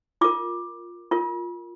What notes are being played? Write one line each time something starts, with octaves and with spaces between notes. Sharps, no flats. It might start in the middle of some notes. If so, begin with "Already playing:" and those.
F4 A#4 D6
F4 A#4